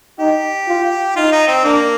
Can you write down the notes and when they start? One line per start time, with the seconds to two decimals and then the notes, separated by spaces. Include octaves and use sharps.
0.19 D#4 G4
0.68 F4
1.16 D#4 F4
1.32 D#4
1.47 C4
1.64 A#3 D4